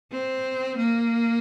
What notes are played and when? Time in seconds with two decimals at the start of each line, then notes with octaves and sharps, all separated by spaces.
0.11 C4
0.77 A#3